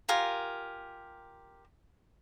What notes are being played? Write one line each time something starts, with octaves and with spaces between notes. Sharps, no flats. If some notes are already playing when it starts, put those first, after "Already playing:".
F4 G4 A#4 G#5